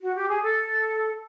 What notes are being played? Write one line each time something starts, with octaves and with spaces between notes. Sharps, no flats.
F#4
G4
G#4
A4